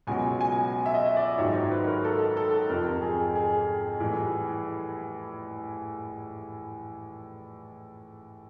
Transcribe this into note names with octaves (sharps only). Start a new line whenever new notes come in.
C#2 B2 F#3 G#5
G#5
E5
D#5
D5
G#2 D#3 F#3 C#5
C5
B4
A#4
A4
A4
F2 C3 F3 A#4
G#4
G#4
A2 E3 G3